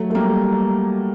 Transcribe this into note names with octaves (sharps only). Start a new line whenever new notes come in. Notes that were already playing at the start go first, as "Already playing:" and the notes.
Already playing: F#3 A3
A3
G3 A#3